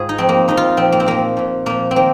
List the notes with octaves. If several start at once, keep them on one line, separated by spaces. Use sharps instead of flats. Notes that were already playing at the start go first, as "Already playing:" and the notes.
Already playing: G#2 F4 G#4
D#4
F2 F3 C4
A#3
F2 F3 D#4
F4
A#2 F3 C4
A#3
C4
A#2 F3 A#3
A#2 F3
A#2 F3 A#3
C4
D#3 A#3